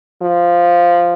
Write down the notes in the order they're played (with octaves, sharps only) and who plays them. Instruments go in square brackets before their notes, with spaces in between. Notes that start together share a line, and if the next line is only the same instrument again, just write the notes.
[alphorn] F3